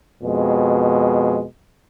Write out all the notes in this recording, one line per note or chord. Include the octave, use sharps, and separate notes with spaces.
F2 B2 G#3